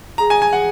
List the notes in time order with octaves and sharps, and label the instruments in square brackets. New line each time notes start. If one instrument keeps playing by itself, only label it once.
[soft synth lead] G#4 [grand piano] A#5
[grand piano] G#5
G#5
F#5